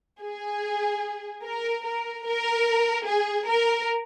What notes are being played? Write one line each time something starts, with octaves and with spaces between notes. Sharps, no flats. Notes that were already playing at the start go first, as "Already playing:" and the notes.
G#4
A#4
A#4
A#4
G#4
A#4